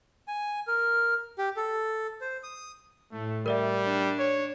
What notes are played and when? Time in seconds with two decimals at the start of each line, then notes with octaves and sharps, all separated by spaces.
0.28 G#5
0.67 A#4
1.38 G4
1.57 A4
2.21 C5
2.43 D#6
3.12 A2 A3
3.46 G3 A#4 D5 E5
3.86 D4
4.19 C#5